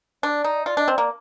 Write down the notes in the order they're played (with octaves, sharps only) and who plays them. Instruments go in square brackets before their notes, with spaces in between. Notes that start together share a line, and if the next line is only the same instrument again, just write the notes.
[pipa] D4 [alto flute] D5
[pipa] D#4
[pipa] F4 [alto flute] D5
[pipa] D4 [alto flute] D#5
[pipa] C4
[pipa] A#3 [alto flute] D5